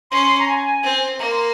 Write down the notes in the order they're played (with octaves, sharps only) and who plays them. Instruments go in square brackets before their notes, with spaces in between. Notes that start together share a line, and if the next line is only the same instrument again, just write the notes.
[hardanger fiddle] C#4 [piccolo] C6
[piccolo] A#5
G#5
[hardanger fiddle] C4
[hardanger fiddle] A#3 [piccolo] A#5
[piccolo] C6